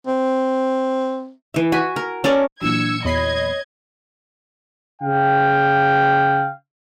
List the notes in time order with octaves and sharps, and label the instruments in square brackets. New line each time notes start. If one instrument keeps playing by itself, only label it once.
[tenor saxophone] C4
[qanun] E3 E5
F#4 G#5 B5
A#4
C#4 A4 A#4 D5
[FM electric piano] A#2 E3 F#3 [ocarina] D4 [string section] E6 G#6 C#7
[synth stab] E2 B5 C7 [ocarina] C#5 [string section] D#5 G#6
[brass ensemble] C#3 F5 G5